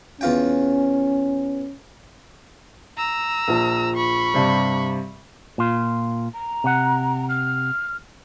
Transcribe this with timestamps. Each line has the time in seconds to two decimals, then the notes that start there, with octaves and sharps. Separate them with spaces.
0.21 E2 C#4 F4 G5
2.98 A#5 E6
3.48 A#1 F3
3.96 B5 C#6
4.34 G2 C3 G3
5.58 A#2 F4
6.34 A#5
6.64 C3 F#5
7.29 F6